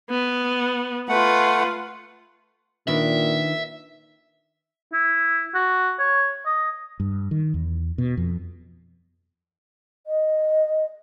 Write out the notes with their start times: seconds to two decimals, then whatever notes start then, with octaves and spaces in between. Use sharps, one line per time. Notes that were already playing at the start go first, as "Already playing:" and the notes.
0.10 B3
1.09 A3 F4 B4 F#5
2.87 A#2 D#3 D4 B4 E5
4.93 E4
5.54 F#4
5.99 C#5
6.46 D#5
7.00 G2
7.31 D#3
7.54 E2
7.98 B2
8.17 F2
10.07 D#5